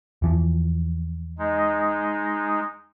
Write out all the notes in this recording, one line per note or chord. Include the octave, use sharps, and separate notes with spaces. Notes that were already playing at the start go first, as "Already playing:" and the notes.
E2 E3 F3
G#3 D#4